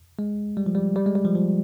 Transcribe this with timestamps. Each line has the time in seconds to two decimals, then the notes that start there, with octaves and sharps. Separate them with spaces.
0.19 G#3
0.57 G3
0.66 F3
0.75 G3
0.96 G3
1.06 G#3
1.15 G3
1.25 F3
1.35 F3